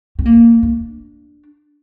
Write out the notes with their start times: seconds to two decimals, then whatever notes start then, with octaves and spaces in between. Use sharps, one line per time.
0.19 C4
0.26 A#3
0.63 D4